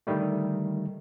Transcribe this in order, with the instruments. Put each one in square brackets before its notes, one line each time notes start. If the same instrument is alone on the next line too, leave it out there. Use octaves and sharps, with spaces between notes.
[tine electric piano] D3 D#3 G3 A3